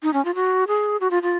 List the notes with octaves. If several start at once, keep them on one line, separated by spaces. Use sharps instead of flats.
D#4
C#4
F4
F#4
G#4
F#4
F4
F4